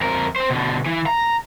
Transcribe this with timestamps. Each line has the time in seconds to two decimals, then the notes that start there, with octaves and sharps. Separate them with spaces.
0.01 F2 A#4
0.36 C4 C5
0.50 B2 D3
0.86 E3
1.06 A#5